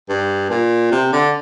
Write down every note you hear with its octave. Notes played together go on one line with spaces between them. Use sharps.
G2
A#2
C3
D3